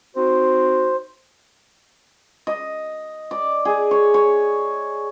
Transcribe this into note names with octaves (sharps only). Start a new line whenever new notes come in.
C4 D#4 F#4 C5
D#5
D5
G#4
C#5
C#5